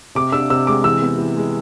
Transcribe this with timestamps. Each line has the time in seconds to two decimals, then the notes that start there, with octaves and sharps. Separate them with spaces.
0.15 C3 D6
0.32 D4 E6
0.50 C3 E6
0.67 G#3 D6
0.84 E3 E6
1.02 B3
1.19 E3
1.36 G#3